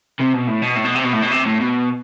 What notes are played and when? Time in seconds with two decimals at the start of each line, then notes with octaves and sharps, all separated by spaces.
0.20 C3
0.34 B2
0.48 A2
0.62 B2
0.76 A2
0.85 B2
0.95 C3
1.04 B2
1.13 A2
1.22 B2
1.32 C3
1.46 A2
1.61 B2